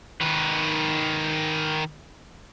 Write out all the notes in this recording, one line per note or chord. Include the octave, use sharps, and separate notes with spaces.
D#3 B4